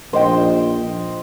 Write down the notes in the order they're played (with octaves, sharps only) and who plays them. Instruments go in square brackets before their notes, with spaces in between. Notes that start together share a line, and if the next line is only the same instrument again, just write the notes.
[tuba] A#1 [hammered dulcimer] C5 D#5 G5